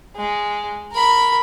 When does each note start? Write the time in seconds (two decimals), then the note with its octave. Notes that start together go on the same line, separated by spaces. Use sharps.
0.16 G#3
0.92 A#4 B5